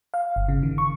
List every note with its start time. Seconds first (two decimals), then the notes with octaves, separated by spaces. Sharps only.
0.14 F5
0.36 G1
0.49 C#3
0.63 D#3
0.78 C#6